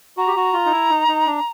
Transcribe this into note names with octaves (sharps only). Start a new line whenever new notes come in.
F#4 A#5
G4
F#4
F4
D#4
E4
D#4
D#4
D4